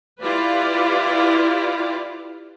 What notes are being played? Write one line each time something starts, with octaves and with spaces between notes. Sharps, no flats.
E4 F4 G4 B4 D5 F5